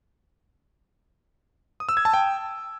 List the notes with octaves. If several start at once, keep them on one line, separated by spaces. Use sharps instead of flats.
D#6
E6
G#6
A5
G5